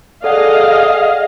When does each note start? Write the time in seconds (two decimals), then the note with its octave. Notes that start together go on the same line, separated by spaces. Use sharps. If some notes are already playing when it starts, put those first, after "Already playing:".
0.24 G#4 A4 D5 D#5 F5 F#5